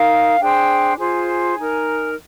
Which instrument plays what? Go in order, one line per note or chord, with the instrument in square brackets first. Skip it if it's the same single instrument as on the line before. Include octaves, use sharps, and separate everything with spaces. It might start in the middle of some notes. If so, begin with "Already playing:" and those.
Already playing: [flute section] D#4 A#4 F5
D4 G#4 C5 G5
F4 G#4 C5 G#5
D#4 A#4